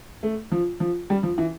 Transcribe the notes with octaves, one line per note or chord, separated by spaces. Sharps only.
A3
F3
F3
G3
F3
E3